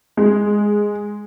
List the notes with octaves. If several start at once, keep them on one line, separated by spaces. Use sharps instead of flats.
G#3